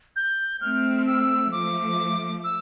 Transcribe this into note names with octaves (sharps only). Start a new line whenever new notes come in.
G6
A3 C4 F6
E6
F3 A3 D6
E6